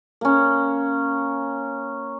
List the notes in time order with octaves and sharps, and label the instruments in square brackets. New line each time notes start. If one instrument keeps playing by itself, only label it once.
[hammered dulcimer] A#3 C#4